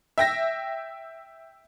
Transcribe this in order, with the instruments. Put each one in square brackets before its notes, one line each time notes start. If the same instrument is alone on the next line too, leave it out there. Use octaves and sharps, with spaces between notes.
[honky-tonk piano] E5 G5 A#6